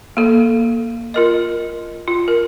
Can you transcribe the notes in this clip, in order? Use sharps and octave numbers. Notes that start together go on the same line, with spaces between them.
A#3 A4
F4 A#4 D#5
F4
A#4